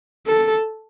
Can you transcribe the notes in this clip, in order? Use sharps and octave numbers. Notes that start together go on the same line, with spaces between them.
A4